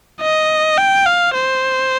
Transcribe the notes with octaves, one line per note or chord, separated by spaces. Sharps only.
D#5
G5
F5
C5